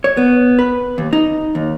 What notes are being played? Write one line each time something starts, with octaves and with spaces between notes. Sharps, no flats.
C#5
B3
B4
D#2
D#4
D#2